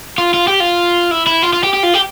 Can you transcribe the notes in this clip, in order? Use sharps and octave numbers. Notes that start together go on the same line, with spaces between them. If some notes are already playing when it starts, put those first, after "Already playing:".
F4
F4
G4
F4
E4
E4
F4
F4
G4
G4
F4
G4